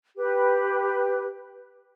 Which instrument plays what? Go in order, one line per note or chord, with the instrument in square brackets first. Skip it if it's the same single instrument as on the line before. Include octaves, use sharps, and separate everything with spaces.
[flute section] G4 B4